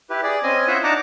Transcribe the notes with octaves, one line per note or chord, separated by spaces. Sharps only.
E4 G4 B4
G#4 D5
C4 C#4 D#5 G#5
E4 F4 C5 C#5 E5 F#5
D4 D#4 F#5 A5 A#5 D6